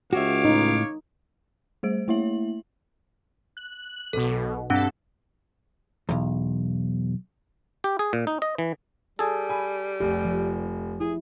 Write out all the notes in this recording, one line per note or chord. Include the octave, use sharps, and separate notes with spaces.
C#2 F#4 G4 C#5 E5 F5 D6
A2 D#4
G3 A3 G#4 C5 D7
A3 A#3 E4 C#5 E5 F#7
F#6
B1 B2 A4
G2 C4 D4 A4 F#5
B1 E2
G4
G#4
A#2
D#4
D#5
E3
G3 G#4 A4
G#5 B5
F1 G4
F3
E4 G#4